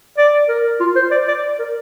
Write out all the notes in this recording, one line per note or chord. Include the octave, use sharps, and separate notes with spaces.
D5
A#4
F4
C5
D5
D5
A#4